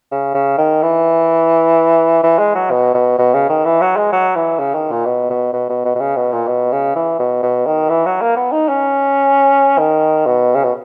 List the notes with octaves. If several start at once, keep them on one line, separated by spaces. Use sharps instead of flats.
C#3
C#3
D#3
E3
E3
G#3
F#3
B2
B2
B2
C#3
D#3
E3
F#3
G#3
F#3
E3
C#3
D#3
A#2
B2
B2
B2
B2
B2
B2
C#3
B2
A#2
B2
C#3
E3
B2
B2
D#3
E3
F#3
A#3
B3
D#4
C#4
D#3
B2
C#3
B2